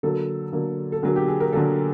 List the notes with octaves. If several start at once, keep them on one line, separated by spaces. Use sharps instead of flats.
D3 F#3 A#3 A4
D3 F#3 A#3
A4
D3 F#3 A#3 G#4
G4
G#4
A#4
D3 F#3 A#3 A4